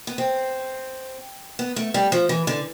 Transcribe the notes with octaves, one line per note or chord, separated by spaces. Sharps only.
B3
C4
B3
A3
G3
F3
E3
D3